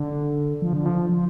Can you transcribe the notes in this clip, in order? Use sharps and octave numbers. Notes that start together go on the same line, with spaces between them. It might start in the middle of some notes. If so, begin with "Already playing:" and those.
Already playing: D3
F3
D3
F3
F3